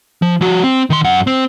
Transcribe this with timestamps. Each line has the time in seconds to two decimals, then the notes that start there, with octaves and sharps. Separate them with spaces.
0.22 F3
0.41 F3 F#4
0.64 C4
0.90 D#3 C6
1.04 F#2 F#5
1.27 C4